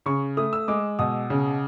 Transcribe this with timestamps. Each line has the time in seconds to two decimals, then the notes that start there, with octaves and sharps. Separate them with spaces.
0.06 C#3 C#6
0.37 A3 D#6
0.53 E6
0.68 G#3 D6
0.99 B2 D#6
1.30 C#3